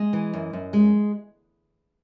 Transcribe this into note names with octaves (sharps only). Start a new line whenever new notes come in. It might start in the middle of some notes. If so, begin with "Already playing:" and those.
Already playing: G#3 D#5
E3
F#2
F#2
G#3